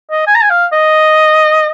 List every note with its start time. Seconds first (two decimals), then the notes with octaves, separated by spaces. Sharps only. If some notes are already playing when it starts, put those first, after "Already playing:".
0.10 D#5
0.27 G#5
0.35 A#5
0.42 G#5
0.50 F5
0.72 D#5